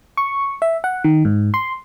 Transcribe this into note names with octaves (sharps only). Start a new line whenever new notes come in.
C#6
E5
F#5
D#3
G#2
C6